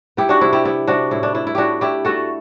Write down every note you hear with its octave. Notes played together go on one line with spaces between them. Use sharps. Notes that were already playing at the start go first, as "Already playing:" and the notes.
B3 E4 G4
D4 F#4
C3 E4
E4 G4
B3 E4
C3 D4 F#4
A2 E4
D4
D4 E4
E4
A2 D4 F#4 G4
D4 E4 G4
A3 F#4 A4